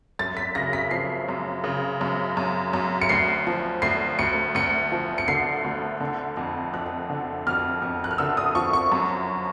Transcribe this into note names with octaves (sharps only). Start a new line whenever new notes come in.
F#2 A6
B6
C#3 A#6
B6
F3 C7
F#2
C#3
F#2
F#2
F#2
C#7
D2 C7
F3
D2 C7
D2 C#7
D2 C#7
F3
C#7
D3 C7
D2
D3
F2
F2 F#6
D3
F2 F6
F2
F#6
F6
D3 E6
D#6
F3 C#6
C#6
F#2